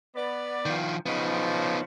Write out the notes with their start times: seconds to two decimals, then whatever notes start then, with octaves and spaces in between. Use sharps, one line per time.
0.15 B3 D5
0.66 D#3 F3
1.06 C#3 F3 B3 D#4